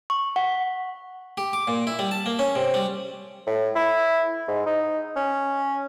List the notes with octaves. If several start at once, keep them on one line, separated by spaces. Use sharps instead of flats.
C#6
F#5
G4
D6
A#2
E4
G3
A5
A#3
C#4
C3
G3
A2
E4
G#2
D#4
C#4